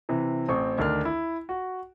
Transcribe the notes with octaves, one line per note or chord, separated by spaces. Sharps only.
C3 E3
A1 C4 C#6
D2 D#3 D4 F6
E4
F#4